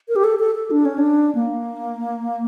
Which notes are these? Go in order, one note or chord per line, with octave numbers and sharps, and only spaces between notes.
A#4
G4
A4
A4
A4
D4
C#4
D4
A#3